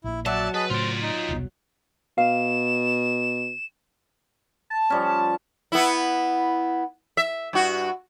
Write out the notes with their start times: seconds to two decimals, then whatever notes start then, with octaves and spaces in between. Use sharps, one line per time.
0.04 A#1 A#2 E4
0.26 F#3 D5 E5 A5
0.54 G#4 B4 D#5 A5
0.70 A2 C#3 F4 C5 D5
1.02 D#4
1.29 E1 C2 B3
2.18 B2 F5 E7
4.70 A5
4.90 F3 G3 C#4
5.72 B3 E4
7.17 E5
7.53 G2 F#4